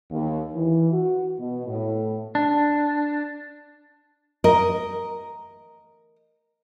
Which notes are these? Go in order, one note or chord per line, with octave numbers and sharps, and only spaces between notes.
D#2
E3
F#4
B2
A2
D4
A#4 D#5